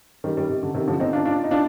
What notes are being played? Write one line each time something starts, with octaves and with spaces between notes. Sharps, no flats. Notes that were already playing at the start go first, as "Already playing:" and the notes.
D#3 G3
D#3 G3
C3
D3
C3 D#3
D3 F3
C4 D#4
D4 F4
D4 F4
D#4
D4 F4